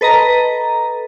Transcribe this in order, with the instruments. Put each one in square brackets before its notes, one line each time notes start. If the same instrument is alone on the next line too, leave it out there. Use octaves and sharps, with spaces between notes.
[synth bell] A4 B4 D#5 A#5